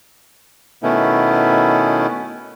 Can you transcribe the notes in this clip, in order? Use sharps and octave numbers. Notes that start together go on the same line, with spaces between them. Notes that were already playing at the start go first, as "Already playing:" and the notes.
B2 D#3 A3 B3 C#4 E4